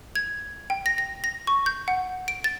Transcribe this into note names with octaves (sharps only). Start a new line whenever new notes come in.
G#6
G5
A#6
A#6
A#6
C#6
G6
F#5
D7
A6